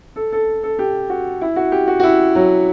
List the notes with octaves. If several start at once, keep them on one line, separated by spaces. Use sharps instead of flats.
A4
A4
A4
G4
F#4
E4
F#4
G4
F#4
F#4
E4
F#3